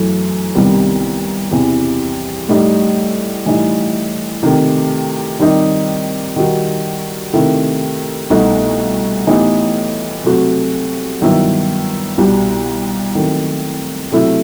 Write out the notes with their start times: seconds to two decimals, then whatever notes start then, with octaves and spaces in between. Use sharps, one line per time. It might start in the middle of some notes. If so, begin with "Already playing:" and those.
Already playing: F#2 E3 A3
0.55 C2 C3 D#3 G3 B3
1.51 E2 C3 E3
2.49 A2 G3 D#4
3.46 A2 E3 G3 D#4
4.43 C3 D#3 A3
5.40 D#3 G3 C4 D#4 G4
6.36 D#3 G3 D#4 F#4
7.33 C3 D#3 A3 E4
8.30 C2 B2 A3 D#4 F#4
9.27 A2 E3 B3 D#4 G4
10.24 C3 F#3 A3 C4 F#4
11.21 G2 D#3 F#3 B3 E4
12.18 C2 B2 G3
13.15 D#3 F#3 A3 C4
14.12 C3 F#3 A3 E4